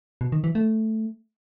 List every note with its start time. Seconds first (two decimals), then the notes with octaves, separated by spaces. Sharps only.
0.21 B2
0.32 D#3
0.44 E3
0.55 A3